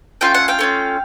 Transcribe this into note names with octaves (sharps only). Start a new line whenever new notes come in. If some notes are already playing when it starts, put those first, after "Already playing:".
A3 C#4 F4 G5
F#5
F5 G5
A3 C#4 F4